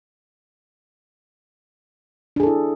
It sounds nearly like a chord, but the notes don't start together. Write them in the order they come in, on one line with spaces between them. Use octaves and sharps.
D4 G#4 A4 E4